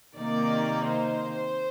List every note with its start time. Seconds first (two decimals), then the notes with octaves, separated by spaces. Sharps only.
0.16 C3 D#3 A#3 D#4 D5
0.86 C5